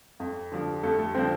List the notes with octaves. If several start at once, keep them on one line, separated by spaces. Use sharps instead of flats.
F2
D3 F3
F2 A3 A4
A3 A4
D3 F3 C4 C5